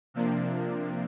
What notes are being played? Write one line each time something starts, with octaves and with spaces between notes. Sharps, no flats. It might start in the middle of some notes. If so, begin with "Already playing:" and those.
C3 F3 A#3 D4